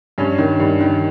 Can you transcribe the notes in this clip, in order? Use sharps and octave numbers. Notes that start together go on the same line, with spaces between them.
G2 C#4
D#3
G2
D#3